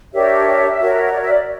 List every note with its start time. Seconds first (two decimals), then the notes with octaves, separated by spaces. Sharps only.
0.13 D4 G4 A#4 C#5 E5
0.80 F#4 A#4 C#5
1.05 E5
1.12 D5
1.20 E5
1.29 D5